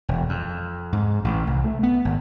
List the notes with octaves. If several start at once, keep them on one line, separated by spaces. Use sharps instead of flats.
E1
F2
G#2
A1
C2
A3
B3
G#1